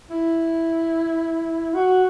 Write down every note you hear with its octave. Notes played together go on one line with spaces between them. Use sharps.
E4
F#4